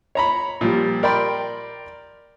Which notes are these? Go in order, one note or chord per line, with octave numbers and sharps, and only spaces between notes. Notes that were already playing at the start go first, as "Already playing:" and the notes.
C#5 A#5 B5
A#2 F3 G3
A#4 D5 G5 B5 C6